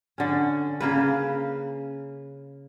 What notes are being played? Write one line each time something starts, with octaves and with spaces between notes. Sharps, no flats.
D3 C#4
C#3 A#3 B4